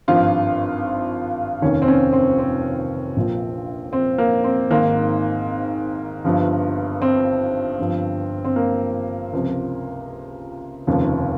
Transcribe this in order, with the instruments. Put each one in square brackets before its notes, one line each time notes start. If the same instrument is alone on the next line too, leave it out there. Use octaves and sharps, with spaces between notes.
[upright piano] G#1 G2 F3 F4
F1 D#2 D#3 C#4
C4
C#4
C4
C4
A#1 A#2 F3
C4
A#3
C4
G#1 G#2 D#3 A#3
G1 G2 F3
C4
G1 G2 F3
C4
A#3
C#2 C3 F3
F1 D#2 C#3 F3